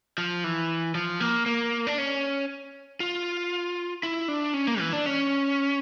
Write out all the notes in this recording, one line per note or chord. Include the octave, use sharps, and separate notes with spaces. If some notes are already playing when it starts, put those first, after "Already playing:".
F3
E3
F3
A#3
A#3
D4
C#4
F4
E4
D4
C#4
A#3
E3
D4
C#4